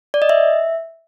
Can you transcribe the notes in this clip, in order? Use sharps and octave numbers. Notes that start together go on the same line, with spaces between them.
D5
D#5
E5